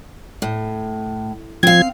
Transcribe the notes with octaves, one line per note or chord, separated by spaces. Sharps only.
A2
F3 C4 F5 G#6